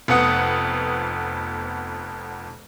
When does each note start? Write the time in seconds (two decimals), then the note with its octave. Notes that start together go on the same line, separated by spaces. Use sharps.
0.08 F1 F2 B3 F#5 D#6